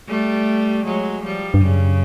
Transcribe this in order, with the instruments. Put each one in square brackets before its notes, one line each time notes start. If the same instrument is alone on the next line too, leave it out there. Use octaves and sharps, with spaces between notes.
[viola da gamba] G3 A3
F#3 G#3
F3 G3
[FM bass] G2
[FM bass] F#2 [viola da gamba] C#3